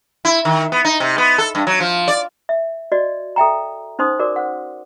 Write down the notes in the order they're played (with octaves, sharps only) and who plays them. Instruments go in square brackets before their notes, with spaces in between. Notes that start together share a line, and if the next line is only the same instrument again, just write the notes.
[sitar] E4
D#3
B3
D#4
C3
B3
A4
G2
F#3
F3
D5
[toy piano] E5
F#4 D5 D#5
A4 E5 G5 A#5
C#4 D#4 C5 C6 D#6
F#4 A#4 D5 D6
C5 F#5